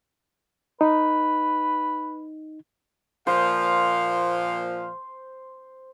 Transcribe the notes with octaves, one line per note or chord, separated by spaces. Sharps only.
D#4 B4
A#2 F3 C5 F5